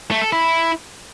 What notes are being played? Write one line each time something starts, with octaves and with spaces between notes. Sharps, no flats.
A3
A4
E4